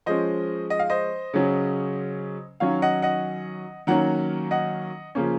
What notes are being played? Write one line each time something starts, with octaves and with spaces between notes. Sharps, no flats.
F3 G#3 C#4 C5 D#5
D#5
F5
C5 D#5
C#3 F#3 C#4
D#3 F#3 C#4 C#5 F5
D#5 F#5
D#5 F#5
D#3 F#3 A#3 C#4 F#5 A#5
D#5 F#5
C#3 F3 A#3 C#4